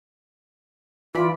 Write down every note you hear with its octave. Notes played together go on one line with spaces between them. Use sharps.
E3 F4 D5 B5